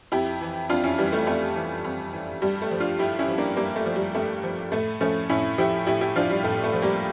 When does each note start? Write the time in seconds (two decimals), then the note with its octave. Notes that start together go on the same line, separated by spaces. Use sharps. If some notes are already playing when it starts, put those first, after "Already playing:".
0.12 F2 E4 G4
0.41 E3
0.69 F2 D4 F4
0.84 C#4 E4
0.98 E3 G3
1.12 A3
1.27 F2 A3
1.56 E3
1.85 F2
2.13 E3
2.42 G2 G3
2.62 A3
2.71 F3
2.80 D4 F4
2.99 G2 E4 G4
3.19 C#4 E4
3.28 F3
3.38 A#3 D4
3.56 G2 G3 A#3
3.76 A3
3.86 F3
3.96 G3
4.15 G2 A3
4.43 F3
4.72 A2 A3
5.01 F3 A3 C#4
5.29 A2 C#4 E4
5.58 F3 E4 G4
5.87 A2 E4 G4
6.01 E4 G4
6.16 F3 D4 F4
6.30 G3
6.44 A2 A3
6.64 A3
6.73 F3
6.82 G3 A#3